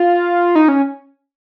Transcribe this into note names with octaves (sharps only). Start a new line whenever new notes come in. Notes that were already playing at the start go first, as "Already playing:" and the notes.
Already playing: F4
D#4
C#4